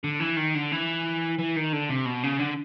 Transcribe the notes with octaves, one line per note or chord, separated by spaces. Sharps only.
D3
E3
D#3
D3
E3
E3
D#3
D3
C3
B2
C#3
D3